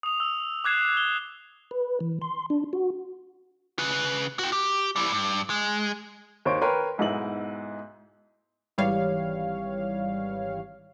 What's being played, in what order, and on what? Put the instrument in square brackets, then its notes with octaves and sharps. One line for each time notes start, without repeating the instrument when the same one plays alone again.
[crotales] D#6 F7
E6
D6 F#6 G#6 C7 E7
G7
[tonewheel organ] B4
E3
C6
D4
F#4
[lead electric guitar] C#3 B4
F#4 G5
G4
G3 E4
G2
G#3
[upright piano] D#2 C5 C#5 C6 C#6 D7
A#4 B4 C#5 G5 C6
B1 G#2 B3 E4 D#5 F#7
[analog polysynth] G#1 E3 G3 C#5 F5